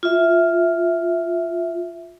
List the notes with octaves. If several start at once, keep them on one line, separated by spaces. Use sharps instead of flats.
F4 E5